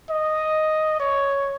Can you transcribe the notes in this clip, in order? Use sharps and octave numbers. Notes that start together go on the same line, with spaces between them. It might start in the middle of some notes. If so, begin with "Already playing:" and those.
D#5
C#5